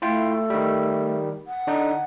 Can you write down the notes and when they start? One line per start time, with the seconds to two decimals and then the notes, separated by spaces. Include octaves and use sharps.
0.02 A3 E4 F4 G5
0.50 D#3 G3
1.47 F#5
1.67 D3 D4 D#4